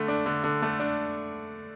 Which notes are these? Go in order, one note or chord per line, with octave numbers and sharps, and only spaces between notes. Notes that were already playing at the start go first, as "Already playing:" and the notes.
Already playing: D3 A3
D4
D3
D3
A3
D4